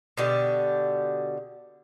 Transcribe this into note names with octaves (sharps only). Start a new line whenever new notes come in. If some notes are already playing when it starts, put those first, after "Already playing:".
B2 D3 G4